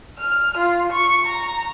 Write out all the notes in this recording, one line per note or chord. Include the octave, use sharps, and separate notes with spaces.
F6
F4
C#6
A#5